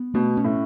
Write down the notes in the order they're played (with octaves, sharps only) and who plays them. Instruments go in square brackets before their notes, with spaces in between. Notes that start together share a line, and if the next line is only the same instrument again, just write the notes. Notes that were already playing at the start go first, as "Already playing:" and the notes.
Already playing: [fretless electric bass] B3
[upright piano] B2 [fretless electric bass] A3
[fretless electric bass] C#4
[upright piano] A2